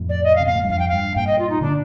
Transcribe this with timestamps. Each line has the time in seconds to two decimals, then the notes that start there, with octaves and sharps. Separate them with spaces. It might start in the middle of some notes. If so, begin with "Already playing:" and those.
Already playing: F2 A2
0.09 D5
0.24 D#5
0.36 F5
0.40 C3
0.47 A#2 F5
0.55 A2
0.63 G2
0.70 F2 F5
0.79 G5
0.89 G2 F5
1.16 G2 A#2 G5
1.27 D#5
1.39 F4
1.50 D#4
1.61 A#2 D3 D4